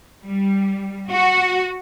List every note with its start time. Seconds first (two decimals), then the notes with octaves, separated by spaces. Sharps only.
0.25 G3
1.10 F#4